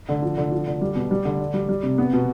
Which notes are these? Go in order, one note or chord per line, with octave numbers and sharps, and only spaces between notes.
D3
F3
D3
F3
D3
G3
B2
G3
D3
D4
G3
G3
C3
B3
B2